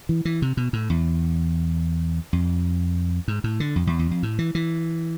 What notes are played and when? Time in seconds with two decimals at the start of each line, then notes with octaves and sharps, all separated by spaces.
0.09 E3
0.25 E3
0.42 C3
0.57 B2
0.73 A2
0.90 E2
2.33 F2
3.28 G#2
3.44 A2
3.60 D3
3.76 F2
3.87 E2
3.99 E2
4.11 F2
4.23 A2
4.39 E3
4.55 E3